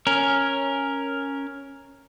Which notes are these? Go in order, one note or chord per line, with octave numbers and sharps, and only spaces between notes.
C#4 A#4